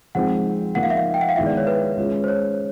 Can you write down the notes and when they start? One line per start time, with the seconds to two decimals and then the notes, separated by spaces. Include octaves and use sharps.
0.15 F3 G#3 C4 D#4 F#5
0.75 F3 A#3 D#4 F#5
0.83 F5
0.90 E5
0.97 F5
1.14 G5
1.21 F#5
1.29 F5
1.36 D#3 G#3 B3 E4 E5
1.46 D5
1.57 C#5
1.67 B4
1.97 G#3 C#4 F4
2.24 C5
2.28 C#5